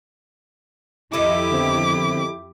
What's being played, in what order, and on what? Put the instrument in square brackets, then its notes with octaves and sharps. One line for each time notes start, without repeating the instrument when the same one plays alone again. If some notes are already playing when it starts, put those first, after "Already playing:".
[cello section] F2 E4 G4 [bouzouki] D#3 D#4 A4 [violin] D6
[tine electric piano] D3 B3 C4